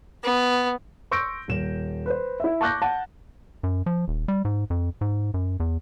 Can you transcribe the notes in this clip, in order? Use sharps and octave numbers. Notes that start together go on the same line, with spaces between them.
B3
C6 C#6 E6 G6 A#6 D7
D#1 E7
B4 C5
E4 E5
A5 C#6 D6 F#6 G6 A#6
F#5 A5
F#2
F3
D#1
G3
G#2
F2
G#2
F#2
E2